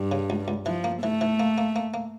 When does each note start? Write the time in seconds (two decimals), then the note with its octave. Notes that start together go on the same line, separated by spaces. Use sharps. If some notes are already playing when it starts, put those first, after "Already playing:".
Already playing: G2 G3
0.12 C#3
0.30 C#2
0.48 C#2
0.66 E3 F3
0.84 A#3
1.02 E3 A3
1.21 E3
1.40 A#3
1.58 A#3
1.76 A#3
1.94 A#3